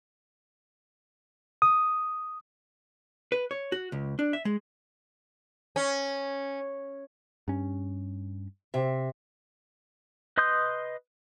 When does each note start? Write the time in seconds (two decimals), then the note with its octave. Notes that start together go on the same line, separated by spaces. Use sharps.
1.62 D#6
3.32 B4
3.51 C#5
3.72 F#4
3.92 C#2
4.19 D4
4.33 E5
4.45 G#3
5.76 C#4
7.48 G2 C#4
8.74 C3 E5
10.38 B4 D#5 C6 D#6 G6